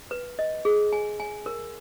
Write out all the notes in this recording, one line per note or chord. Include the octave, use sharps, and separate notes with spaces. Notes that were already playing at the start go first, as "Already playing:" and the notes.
B4
D#5
G#4
G#5
G#5
A#4